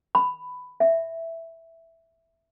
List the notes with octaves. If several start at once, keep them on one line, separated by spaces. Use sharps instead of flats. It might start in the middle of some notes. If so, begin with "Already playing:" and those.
B5
E5